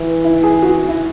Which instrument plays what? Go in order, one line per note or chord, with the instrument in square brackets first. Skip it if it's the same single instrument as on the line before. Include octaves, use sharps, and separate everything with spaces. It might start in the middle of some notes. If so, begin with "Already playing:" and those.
Already playing: [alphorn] E3
[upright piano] E4
G#4
F#4
E4